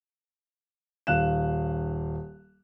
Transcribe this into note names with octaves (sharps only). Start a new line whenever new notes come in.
D#1 F5 F#6 E7